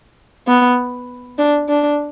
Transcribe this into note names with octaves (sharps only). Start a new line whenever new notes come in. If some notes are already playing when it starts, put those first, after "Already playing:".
B3
D4
D4